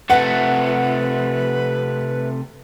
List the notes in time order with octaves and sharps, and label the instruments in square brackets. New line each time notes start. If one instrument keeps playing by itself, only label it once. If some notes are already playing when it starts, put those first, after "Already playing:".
[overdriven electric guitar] C3 A3 [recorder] B4 [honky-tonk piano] F#5